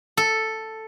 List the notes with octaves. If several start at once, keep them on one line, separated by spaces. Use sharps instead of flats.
A4